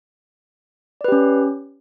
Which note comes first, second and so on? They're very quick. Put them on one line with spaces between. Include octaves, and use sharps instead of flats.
D5 B4 G4 C#4